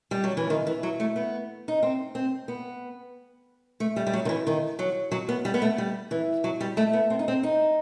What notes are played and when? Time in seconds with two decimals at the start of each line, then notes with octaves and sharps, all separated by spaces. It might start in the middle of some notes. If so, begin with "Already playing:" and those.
0.11 G3
0.24 F#3
0.37 E3
0.50 D#3
0.67 E3
0.83 F#3
1.00 A3
1.16 B3
1.68 D#4
1.83 C4
2.15 C4
2.48 B3
3.80 A3
3.96 G3
4.07 G3
4.13 F#3
4.25 D#3
4.29 E3
4.47 D#3
4.79 F#3
5.12 F#3
5.29 B3
5.45 G3
5.54 B3
5.62 A3
5.78 G3
6.11 E3
6.44 F#3
6.61 G3
6.77 A3
6.93 B3
7.10 C4
7.19 D#4
7.28 C4
7.43 D#4